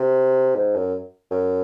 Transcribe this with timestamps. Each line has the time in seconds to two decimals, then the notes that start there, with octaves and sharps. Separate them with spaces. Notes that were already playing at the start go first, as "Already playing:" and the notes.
Already playing: C3
0.55 G#2
0.75 F#2
1.31 F#2